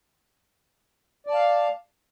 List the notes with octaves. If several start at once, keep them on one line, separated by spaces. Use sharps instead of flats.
D5 F5 A5